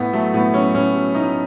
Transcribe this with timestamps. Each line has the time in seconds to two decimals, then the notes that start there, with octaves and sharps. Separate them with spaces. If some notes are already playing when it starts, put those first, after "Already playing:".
Already playing: A2 B3
0.13 F#3 A3
0.34 A2 B3
0.54 F#3 C#4
0.75 A2 C#4
0.95 F#3
1.14 A2 D#4